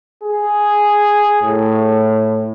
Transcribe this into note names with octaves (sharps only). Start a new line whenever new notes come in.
G#4
A2